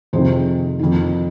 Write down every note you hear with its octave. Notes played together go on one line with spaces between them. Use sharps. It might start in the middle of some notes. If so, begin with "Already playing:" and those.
F2 C3 D#3 G#4 C5
F2 D#3